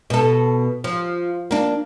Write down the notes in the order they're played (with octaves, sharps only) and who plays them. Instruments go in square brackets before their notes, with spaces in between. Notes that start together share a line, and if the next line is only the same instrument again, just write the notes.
[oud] B2 A4
F3
A#3 D4